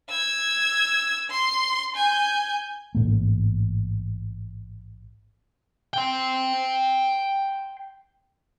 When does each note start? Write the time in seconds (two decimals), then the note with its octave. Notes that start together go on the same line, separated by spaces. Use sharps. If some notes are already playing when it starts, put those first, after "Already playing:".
0.10 E6 G#6
1.30 C6
1.96 G#5 G6
2.95 A1 G#2 A#3
5.93 G5 C6